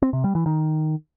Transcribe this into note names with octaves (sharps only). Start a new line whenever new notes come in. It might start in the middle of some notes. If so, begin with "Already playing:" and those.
C4
C3
G3
E3
D#3